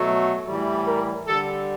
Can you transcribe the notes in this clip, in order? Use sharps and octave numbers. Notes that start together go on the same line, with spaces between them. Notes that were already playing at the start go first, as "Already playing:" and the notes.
Already playing: B2 F#3 A3
A2 E3 G3
A#4
D3 G3 A4